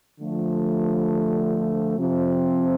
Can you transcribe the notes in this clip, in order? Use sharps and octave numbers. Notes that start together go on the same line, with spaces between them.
D3 F3 A3
C3 F3 C4